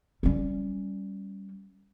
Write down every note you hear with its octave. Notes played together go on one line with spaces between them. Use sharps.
G3 C#4